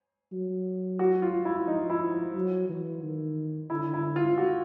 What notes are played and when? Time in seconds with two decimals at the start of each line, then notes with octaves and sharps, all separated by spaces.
0.32 F#3
0.99 F#4
1.22 F4
1.45 E4
1.67 F3 D#4
1.90 E4
2.35 F#3
2.69 E3
3.03 D#3
3.70 D3 E4
3.94 E4
4.16 F4
4.38 F#4